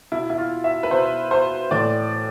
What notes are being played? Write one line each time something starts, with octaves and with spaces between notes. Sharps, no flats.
B2 E4
E4
F4
E5
B4
B2 C5
C5
A2 E3 D5